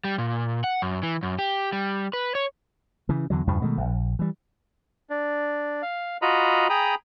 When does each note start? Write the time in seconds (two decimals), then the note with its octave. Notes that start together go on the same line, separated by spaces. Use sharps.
0.04 G3
0.18 A#2
0.64 F#5
0.82 F#2
1.03 E3
1.23 F#2
1.39 G4
1.72 G3
2.13 B4
2.35 C#5
3.09 C#3 E3
3.30 E2 D3 F#3
3.47 E2 G2 C#3 F3
3.62 B2 D#3 G#3 A3
3.77 D1 A#1
4.19 E3 G3
5.10 D4
5.82 F5
6.22 F4 F#4 D#5 A#5 B5
6.70 G#4 G5 A#5 B5 D#6